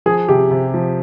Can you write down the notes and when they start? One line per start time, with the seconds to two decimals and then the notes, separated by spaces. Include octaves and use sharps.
0.06 F3 G#4
0.29 C3 G4
0.51 C3
0.74 F3